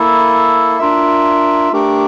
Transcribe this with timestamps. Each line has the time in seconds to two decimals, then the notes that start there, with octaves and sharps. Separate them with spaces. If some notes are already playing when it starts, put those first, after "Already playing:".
Already playing: A#3 E4 A4
0.79 D4 F4 A#4 E5
1.73 A3 D4 G4 A#4